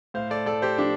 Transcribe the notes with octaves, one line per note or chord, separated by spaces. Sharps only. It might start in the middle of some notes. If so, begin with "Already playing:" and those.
A2 C5 F5
A4 D5
A2 A4 D5
G4 C5
F3 D4 G4